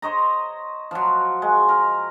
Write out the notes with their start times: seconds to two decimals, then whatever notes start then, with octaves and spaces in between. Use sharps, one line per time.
0.02 C5 C#5 D#5 A#5
0.91 F3 F#3
1.42 G#3
1.69 A#4